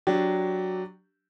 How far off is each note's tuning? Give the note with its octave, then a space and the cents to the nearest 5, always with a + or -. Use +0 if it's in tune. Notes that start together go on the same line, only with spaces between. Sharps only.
F#3 +0 D4 +0 G4 -10